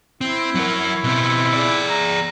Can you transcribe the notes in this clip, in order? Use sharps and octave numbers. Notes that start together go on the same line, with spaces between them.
C4 E4
F#3 A#4
B2 C4
G#4 D5
A#5